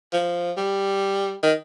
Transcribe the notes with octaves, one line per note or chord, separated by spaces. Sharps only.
F3
G3
D#3